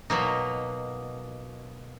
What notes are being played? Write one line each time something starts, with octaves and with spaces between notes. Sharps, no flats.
B2 F#3 A#3 D#4